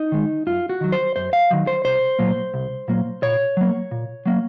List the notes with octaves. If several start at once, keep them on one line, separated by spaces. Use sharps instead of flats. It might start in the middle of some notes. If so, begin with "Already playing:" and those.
Already playing: D#4
D#3 G#3
F#2 F4
F#4
D#3 F#3
C5
F#2 C5
F5
D#3 F#3
C5
C2 C5
A#2 F#3 A#3
C2
A#2 F#3 A#3
A#2 C#5
F#3 A#3
A#2
F#3 A#3